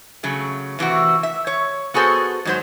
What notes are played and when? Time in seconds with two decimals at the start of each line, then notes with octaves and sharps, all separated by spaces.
0.23 C#3 F#3 A3
0.79 C3 E3 A3 F#4
1.23 E5
1.47 C#5
1.94 B3 F#4 G#4 A4 C5
2.45 G#2 F#3 C5